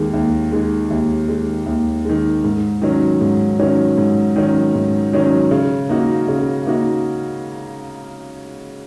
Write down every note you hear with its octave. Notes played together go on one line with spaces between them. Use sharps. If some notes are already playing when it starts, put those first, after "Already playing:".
Already playing: D#2 D#3 G#3
D#2
D#3 G#3
D#2
D#3 G#3
D#2
D#3 G#3
G#2
D#3 F#3 C#4
G#2
D#3 F#3 C#4
G#2
D#3 F#3 C#4
G#2
D#3 F#3 C#4
C#3
A#3 D#4 F#4
C#3
A#3 D#4 F#4